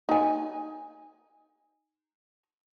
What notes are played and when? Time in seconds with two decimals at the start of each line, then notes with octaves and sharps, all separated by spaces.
0.09 D#4 G#5